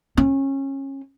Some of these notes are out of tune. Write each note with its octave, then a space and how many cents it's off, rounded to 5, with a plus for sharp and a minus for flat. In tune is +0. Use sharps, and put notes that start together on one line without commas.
C#4 -25